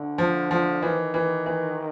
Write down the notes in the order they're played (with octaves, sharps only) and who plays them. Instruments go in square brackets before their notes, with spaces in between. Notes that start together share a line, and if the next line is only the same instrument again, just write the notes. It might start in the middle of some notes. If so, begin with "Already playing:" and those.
Already playing: [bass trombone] D3
[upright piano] F3
F3
[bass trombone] D#3 [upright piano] E3
[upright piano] E3
E3